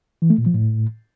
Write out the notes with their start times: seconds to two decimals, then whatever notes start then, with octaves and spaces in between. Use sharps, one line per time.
0.22 E3
0.30 A3
0.38 A#2
0.46 F3
0.54 A2